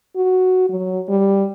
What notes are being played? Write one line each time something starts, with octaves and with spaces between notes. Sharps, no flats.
F#4
F#3
G3